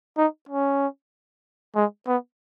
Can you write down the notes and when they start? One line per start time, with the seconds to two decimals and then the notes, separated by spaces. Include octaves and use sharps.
0.17 D#4
0.49 C#4
1.76 G#3
2.07 B3